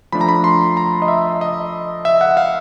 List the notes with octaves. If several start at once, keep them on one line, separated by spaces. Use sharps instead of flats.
F3 A3 D4 B5
A#5
B5
C6
A#5
D#5
E5
D#5
E5
F#5
F5